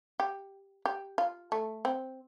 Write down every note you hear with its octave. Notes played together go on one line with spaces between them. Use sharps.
G4
G4
F4
A3
C4